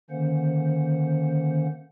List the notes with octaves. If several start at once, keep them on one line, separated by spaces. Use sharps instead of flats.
D3 D#3 A#3 C#4 C5 F#5